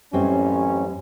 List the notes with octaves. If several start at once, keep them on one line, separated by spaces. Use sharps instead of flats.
A1 F#2 G3 C4 C#4